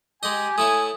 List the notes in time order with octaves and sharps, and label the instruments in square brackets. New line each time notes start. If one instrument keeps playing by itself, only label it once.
[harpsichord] G#3 D#5 [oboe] G4 [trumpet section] G#5
[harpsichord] A3 E4 C#5 [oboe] D#6